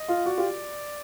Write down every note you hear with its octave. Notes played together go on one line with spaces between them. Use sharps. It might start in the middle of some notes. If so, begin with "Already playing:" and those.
Already playing: D#5
F4
F#4 D5
F4 G4